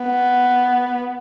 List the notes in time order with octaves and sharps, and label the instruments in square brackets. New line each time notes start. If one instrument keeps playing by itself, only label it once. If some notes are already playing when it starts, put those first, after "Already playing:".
Already playing: [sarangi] B3